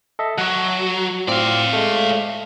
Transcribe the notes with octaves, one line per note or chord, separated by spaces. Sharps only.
A4 D#5 E5
F#3 F#5 C#6
A2 C4 F4 D5 F5
G#3 A3